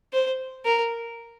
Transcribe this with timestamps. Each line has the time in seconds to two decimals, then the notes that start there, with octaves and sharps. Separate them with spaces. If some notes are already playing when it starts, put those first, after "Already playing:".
0.13 C5
0.65 A#4